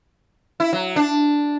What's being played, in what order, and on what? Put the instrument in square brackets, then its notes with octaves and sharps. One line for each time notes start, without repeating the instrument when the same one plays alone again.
[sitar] E4
F#3
D4